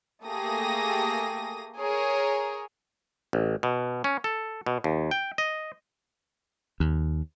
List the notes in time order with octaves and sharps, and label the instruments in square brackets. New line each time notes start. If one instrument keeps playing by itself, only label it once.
[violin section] A3 A#3 G4 G#4 D#6 A#6
G#4 A#4 C#5
[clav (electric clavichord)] A1
B2
C#4
A4
B2
D#2
G5
D#5
[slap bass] D#2